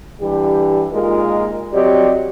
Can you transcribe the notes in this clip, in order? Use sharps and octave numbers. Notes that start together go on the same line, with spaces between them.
D3 E3 G3 G4
A#2 G#3 D#4 F4 A#4
F#3 C4 G4 D5 D#5